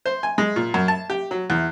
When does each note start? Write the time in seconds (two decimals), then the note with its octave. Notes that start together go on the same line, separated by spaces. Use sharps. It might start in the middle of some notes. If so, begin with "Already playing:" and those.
0.06 C5
0.23 G#5
0.38 G#3
0.56 A#2
0.74 F#2
0.88 A5
1.10 G4
1.31 F#3
1.50 E2